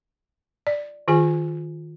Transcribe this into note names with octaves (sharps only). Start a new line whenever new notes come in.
D5
D#3 F4 G#4 G#5